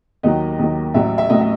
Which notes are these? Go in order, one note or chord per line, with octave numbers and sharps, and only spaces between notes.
D#2 D#3 F#3 D#5
D#2 D#3 F#3
A1 A2 F#3 E5
E5
A1 A2 F#3 D#5
E5